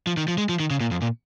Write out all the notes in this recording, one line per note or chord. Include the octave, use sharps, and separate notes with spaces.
F3
D#3
F3
G#3
F3
D#3
C#3
A#2
F2
A#2